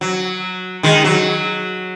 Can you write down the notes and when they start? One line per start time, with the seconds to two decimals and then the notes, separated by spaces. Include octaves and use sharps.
0.01 F#3
0.83 D#3 G#3
1.04 F#3